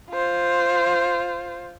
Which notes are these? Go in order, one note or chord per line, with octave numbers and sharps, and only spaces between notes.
F4 C5